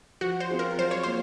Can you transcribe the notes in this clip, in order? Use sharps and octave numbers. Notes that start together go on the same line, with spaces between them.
F3 F#4
C5
C4 F4 G#4
A#4
F#3 C5
C#5
A#3 C5